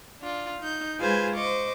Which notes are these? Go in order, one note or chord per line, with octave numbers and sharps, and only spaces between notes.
D4 F4
D#4 G6
G#3 F4 G#4 B4 C5 G#5
C5 D#5 C#6 D6